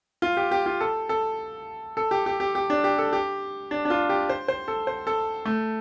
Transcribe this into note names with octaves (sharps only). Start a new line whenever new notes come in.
F4
G4
G4
F4
A4
A4
A4
G4
G4
G4
G4
D4
G4
A4
G4
D4
D4
F4
G4
C5
C5
A4
C5
A4
A3